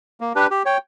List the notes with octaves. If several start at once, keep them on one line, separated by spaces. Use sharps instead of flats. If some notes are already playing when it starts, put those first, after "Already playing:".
A#3
D4 G4 B4
G4
C#5 G5